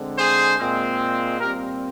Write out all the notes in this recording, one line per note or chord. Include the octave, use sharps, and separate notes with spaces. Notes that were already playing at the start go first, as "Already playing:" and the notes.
Already playing: D3 G#3 C4
G#4 C5
A#2 G#3 C4
A#2 G3 C4 G4 A#4